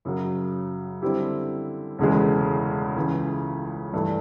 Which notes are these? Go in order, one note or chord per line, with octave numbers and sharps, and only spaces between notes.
F#2 C#3 F#3
D3 G3 C4 E4 G4
E1 D2 C#3 E3 G#3
C#2 C#3 E3
G2 E3 A3